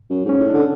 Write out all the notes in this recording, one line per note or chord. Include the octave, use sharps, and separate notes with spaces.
F#2
G#2 C#4
A2
D3 D4